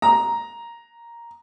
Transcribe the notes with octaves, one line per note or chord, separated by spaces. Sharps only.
A#5